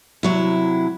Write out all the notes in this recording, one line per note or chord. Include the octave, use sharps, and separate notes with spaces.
C3 F#3 E4